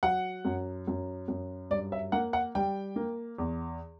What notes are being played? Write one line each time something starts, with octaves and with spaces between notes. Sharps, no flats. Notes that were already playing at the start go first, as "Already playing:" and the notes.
F#3 F#5
F#2
F#2
F#2
G2 D5
E5
A#3 F#5
F#5
G3 G5
A#3
E2